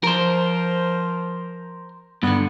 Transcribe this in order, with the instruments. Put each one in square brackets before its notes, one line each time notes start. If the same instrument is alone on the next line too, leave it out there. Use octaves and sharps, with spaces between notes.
[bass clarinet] F3 [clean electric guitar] A#4 C5
[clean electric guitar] G2 D3 [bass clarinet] B3